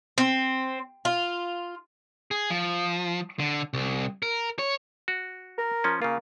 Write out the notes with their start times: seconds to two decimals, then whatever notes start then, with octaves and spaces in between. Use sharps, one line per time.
0.18 C4
1.05 F4
2.31 G#4
2.50 F3
3.39 D3
3.74 C2
4.23 A#4
4.59 C#5
5.08 F#4
5.58 A#4
5.84 F3 C#4
6.02 C#3 A#3 F4